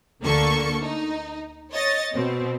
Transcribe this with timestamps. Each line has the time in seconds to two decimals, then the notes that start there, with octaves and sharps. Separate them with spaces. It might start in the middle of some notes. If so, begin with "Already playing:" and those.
0.23 D2 D3 A#3 A4 C#6
0.81 D#4
1.72 C#5 D#5 A6
2.13 B2 C4